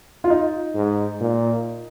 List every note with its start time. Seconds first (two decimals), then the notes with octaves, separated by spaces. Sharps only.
0.24 F4
0.30 D#4
0.75 G#2
1.21 A#2